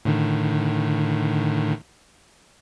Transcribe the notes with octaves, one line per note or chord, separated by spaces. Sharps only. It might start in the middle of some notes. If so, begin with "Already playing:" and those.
A2 D3 D#3